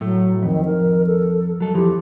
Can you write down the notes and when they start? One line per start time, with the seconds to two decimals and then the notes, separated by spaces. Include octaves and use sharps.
0.01 A2 F#3 A3
0.42 F2 D#3
0.65 A#4
1.07 A4
1.60 F#3 A4
1.74 F2 E3 F3 G4